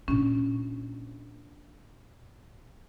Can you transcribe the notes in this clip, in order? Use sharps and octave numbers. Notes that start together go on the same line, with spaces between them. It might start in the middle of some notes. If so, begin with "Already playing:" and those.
A#2 C#4 D4